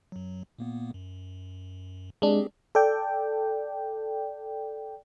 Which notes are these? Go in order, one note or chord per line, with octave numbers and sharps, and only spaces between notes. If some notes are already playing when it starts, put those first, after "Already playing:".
F#2 F#3
A#2 A#3 B3
F#2
G#3 C4 D4 G4 G#4
A4 D5 G5